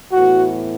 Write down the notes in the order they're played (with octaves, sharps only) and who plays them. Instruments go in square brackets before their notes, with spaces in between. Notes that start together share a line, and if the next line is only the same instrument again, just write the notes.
[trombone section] A2 E3 B3 F#4